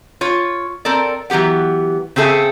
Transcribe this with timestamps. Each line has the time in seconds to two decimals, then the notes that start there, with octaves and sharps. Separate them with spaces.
0.21 F4 C#5
0.85 C4 A4 A#4 D5
1.30 E3 F#3 B3 G4 F#5
2.16 C#3 C4 G#4 A4 E5